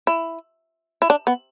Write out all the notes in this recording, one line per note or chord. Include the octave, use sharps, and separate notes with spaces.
E4
E4
D4
B3